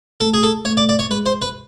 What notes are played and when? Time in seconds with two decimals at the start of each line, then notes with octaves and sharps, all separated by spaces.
0.20 A3 A4
0.34 G#4
0.43 A4
0.65 A3 C#5
0.77 D5
0.89 D5
0.99 C#5
1.10 G#3 B4
1.26 C5
1.42 B4